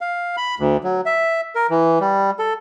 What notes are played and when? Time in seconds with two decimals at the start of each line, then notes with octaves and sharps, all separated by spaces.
0.01 F5
0.37 B5
0.60 D2
0.84 F#3
1.06 E5
1.55 A#4
1.70 E3
2.00 G3
2.39 A4